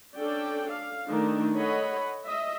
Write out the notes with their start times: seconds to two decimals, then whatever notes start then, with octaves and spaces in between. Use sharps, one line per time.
0.17 C#4 D4 A4 D5 G5
0.72 F5
1.06 D#3 A3 D4 D#4
1.54 A4 C#5 D#5 F#5 B5
2.25 D#5 E5